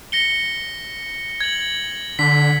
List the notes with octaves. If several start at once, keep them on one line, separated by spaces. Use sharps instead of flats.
A#6 C#7 G7
G#6 F#7
D3 B6